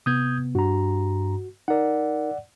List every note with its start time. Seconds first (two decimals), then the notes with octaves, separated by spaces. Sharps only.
0.06 C3 B3 D#6 G6 G#6
0.55 G2 F#4 A#5
1.68 D#4 A#4 D5 F#5